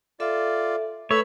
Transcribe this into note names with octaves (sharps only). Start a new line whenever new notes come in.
F4 A4 D5 E5
A3 B4 C#5 E5 B5 E6